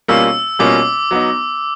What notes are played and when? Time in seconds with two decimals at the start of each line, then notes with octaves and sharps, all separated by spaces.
0.08 B2 G3 A#3 C#4 F4 E6
0.59 B2 G3 A#3 C#4 F4 D6
1.11 F#3 B3 D#4